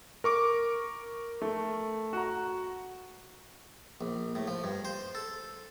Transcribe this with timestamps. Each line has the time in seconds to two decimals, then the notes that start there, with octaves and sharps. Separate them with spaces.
0.24 A#4 C#6 D6
1.42 A3
2.13 F#4 A#5
4.01 A#1
4.35 A2
4.47 F3
4.64 G2
4.85 C5
5.15 A4